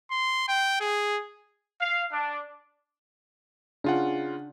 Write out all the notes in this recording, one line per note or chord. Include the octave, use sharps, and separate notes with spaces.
C6
G5
G#4
F5
D4
C#3 D4 F4 F#5